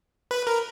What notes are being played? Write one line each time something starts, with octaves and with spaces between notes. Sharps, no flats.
B4
A#4